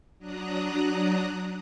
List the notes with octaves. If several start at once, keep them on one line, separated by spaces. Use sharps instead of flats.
F#3 D4 A#5 D#6 F#6